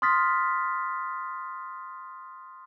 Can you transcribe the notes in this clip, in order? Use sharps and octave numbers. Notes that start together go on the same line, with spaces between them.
C6 D#6 F6 A6 B6